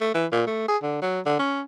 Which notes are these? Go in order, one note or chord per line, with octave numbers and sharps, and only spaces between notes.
A3
E3
A#2
A3
G#4
D3
F#3
D3
C#4